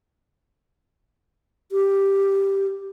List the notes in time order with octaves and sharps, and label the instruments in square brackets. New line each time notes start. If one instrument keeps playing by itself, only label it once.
[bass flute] G4